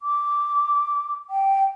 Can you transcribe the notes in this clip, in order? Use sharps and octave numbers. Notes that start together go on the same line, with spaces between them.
D6
G5